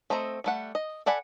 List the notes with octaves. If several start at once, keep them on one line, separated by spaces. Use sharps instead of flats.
A3 C4 D#5 A#5
G3 A3 F#5
D#5
A4 D5 F#5 G#5 B5